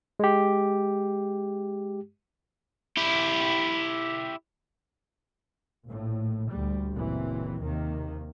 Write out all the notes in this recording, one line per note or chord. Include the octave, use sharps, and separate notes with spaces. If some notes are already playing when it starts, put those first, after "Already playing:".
G#3 G4
E4 G4
A#1 A2
D2 G3
F#1 A#2 E3 C4
D#2 C3 D#3 A#3